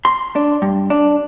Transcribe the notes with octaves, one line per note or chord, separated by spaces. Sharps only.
C6
D4
G2
D4